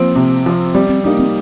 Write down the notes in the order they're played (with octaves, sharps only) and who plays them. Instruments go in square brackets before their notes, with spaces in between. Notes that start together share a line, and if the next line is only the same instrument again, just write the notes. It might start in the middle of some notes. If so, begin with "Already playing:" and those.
Already playing: [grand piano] F3 C4 [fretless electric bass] A#3
[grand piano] C3
F3 C4
[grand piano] G3 [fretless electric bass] C4
[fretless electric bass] C4
[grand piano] A#3 D#4 G4 [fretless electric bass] D4
[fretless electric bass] C4